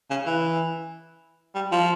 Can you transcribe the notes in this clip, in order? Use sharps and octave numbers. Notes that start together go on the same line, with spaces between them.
C#3
E3
G3
F3